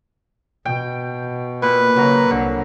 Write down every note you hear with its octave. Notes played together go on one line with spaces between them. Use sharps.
B2 G5
A#2 B4
C#3 F#3 A#5
C2 D3